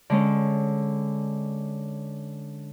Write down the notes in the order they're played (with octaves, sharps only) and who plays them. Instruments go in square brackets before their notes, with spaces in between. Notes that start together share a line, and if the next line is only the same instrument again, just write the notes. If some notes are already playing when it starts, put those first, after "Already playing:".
[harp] D3 G#3 C#4